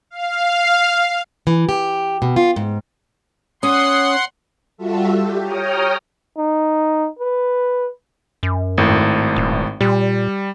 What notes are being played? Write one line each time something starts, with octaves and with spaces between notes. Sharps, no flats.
F5
E3
G4
B2
F4
G#2
C#4 F#5 C6 D#6
G3 F4 F#4 A4 E5
G4
C#5 G5 A#5 D#6 F6
D#4
B4
F#2
G#1 A2
D#1
A#2 G3